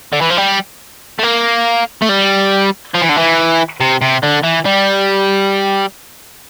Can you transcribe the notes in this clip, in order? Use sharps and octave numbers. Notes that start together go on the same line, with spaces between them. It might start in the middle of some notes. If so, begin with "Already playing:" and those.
D3
E3
F3
G3
A3
A#3
A3
G3
F3
E3
D3
E3
C3
C3
D3
E3
G3